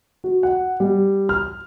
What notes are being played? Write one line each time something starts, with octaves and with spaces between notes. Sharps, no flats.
F#4
F#5
G3
F6